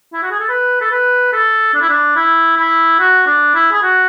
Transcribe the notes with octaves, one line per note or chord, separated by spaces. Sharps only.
E4
F#4
G#4
A4
B4
A4
B4
A4
D4
E4
D4
E4
E4
F#4
D4
E4
G#4
F#4